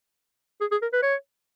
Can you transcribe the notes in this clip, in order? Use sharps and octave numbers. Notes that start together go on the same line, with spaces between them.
G#4
G#4
A#4
B4
C#5